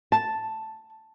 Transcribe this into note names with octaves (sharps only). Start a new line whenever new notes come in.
A5